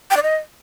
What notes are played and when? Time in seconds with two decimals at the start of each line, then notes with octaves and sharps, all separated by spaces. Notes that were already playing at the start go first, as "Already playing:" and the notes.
0.11 G5
0.17 D5
0.23 D#5